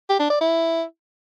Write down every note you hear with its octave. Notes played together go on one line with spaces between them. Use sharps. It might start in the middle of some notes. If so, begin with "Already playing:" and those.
G4
D4
D5
E4